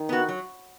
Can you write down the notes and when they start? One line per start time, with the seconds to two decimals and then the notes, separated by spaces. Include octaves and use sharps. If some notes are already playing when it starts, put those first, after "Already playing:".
Already playing: D#3
0.09 B3 F#4
0.28 F#3